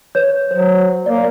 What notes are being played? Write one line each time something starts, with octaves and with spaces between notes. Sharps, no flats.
B4 C#5 G6
F#3 C5
A#3 D5